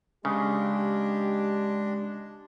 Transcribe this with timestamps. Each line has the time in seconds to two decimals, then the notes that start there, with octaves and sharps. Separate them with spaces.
0.25 C#3 G#3 D4 G4